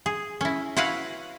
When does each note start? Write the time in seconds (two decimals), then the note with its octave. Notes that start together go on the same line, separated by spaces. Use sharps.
0.06 G#4
0.41 C#4 E4
0.77 E4 F#4 B4 C#5 F5 F#5